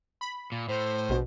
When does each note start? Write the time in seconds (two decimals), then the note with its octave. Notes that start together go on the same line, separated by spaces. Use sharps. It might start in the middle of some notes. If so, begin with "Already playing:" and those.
0.21 B5
0.52 A#2
0.69 A2 C5
1.09 A#1 B2